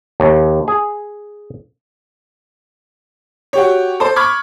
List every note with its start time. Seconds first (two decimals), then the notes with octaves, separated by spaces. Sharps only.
0.20 D#2
0.68 G#4
3.53 F#4 G4 C#5
4.00 A4 C5
4.16 B5 C#6 D6 F6 G#6